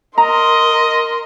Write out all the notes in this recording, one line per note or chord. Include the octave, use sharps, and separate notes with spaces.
A#4 D#5 A#5 C6